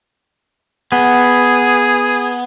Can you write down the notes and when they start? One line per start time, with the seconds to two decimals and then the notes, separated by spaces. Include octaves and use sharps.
0.92 B3 G#4